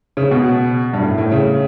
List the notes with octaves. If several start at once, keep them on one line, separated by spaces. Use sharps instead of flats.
C#3
B2
G2
A2
A2
C#3